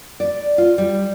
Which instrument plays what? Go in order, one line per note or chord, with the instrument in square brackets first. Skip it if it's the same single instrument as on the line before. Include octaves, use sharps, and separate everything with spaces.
[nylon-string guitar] D5
F4
G3